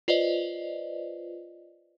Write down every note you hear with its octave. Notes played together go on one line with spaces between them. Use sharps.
F4 B4 C5 D5 D#5